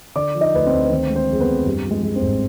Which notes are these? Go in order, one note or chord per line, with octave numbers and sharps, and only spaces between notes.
D3 D5 D6
F3
D#4 D#5
D2 B4
C4 C5
D2
B4
D#3 C4 C5
G#3
C4 C5
F2 G#4
B3 B4
F2
G2 G4
F3
G#3 G#4
G#3
C4 C5
G#1